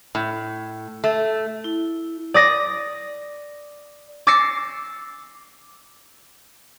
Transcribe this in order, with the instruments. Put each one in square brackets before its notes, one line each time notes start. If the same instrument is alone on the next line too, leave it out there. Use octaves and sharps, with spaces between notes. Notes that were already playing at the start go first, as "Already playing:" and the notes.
[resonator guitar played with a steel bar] A2
A3
[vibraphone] E4
[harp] D5 D#6 A#6
D6 E6 A6 A#6 C7 C#7